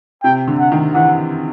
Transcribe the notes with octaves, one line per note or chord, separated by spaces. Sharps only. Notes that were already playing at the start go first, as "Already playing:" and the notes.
C3 G5
D3
F#5
D#3
E3 F#5